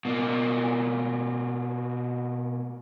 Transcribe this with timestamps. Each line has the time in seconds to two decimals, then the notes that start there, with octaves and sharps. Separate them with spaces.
0.05 B2 A#3